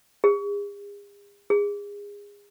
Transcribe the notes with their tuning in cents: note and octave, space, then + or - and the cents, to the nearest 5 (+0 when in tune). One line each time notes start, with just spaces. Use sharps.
G#4 -40
G#4 -30